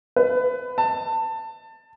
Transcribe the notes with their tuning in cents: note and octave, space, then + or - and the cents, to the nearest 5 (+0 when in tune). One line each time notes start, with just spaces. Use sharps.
B4 +25
A5 +25